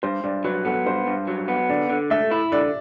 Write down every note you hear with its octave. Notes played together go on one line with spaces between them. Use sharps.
G2 C5
G2 D5
F#3 B4
B3 A4
G2 C5
G2
F#3
B3
D3 D5
D3
A3 E5
E4
D3 D5